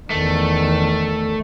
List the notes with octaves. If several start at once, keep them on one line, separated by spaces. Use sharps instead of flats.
E2 D#3 A3